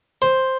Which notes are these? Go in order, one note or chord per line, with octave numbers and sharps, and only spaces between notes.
C5